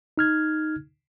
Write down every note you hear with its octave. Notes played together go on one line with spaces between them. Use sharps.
D#4 F6 G#6